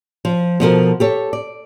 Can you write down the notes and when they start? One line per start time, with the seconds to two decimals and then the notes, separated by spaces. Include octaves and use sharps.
0.25 F3
0.60 B2 F3 A4 A#4
1.00 G4 A4 C#5
1.33 D5